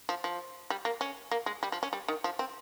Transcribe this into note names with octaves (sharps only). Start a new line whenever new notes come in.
F3
F3
G3
A#3
C#4
A#3
G#3
G3
F3
C#4
G3
D#3
F3
C4